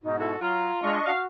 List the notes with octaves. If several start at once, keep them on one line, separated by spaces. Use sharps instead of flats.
G#2 B2 D#4
E4 F#4 A4
F#3 F4 A#5
G#3 D4 D#5 C#6
F#4 F5